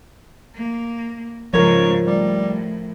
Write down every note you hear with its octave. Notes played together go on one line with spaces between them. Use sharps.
A#3
G#2 C#3 F3 A#4 C#5
A2 G3